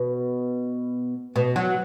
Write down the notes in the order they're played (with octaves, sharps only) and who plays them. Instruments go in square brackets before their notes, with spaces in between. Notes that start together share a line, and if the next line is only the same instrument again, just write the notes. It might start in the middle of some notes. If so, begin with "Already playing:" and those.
Already playing: [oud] B2
B2
F#3